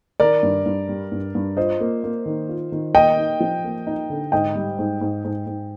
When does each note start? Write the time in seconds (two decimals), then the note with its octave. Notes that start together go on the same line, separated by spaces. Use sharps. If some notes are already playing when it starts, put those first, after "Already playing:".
0.20 D#3 A#4 D5
0.43 G2
0.66 G2
0.89 G3
1.12 G2
1.35 G2
1.57 F4 C5 D#5
1.80 A#3
2.04 A#3
2.26 D#3
2.49 F4
2.72 D#3
2.95 A#3 D#5 G5
3.17 D#4
3.40 F3
3.64 A#3
3.87 D#4
4.10 D3
4.32 G#2 D#5 G5
4.55 G3
4.79 G#2
5.01 G#2
5.24 G#2
5.46 G#2